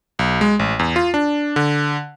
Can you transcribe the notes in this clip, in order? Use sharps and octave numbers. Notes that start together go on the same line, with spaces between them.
B1
G#3
A1
E2
F4
D4
D3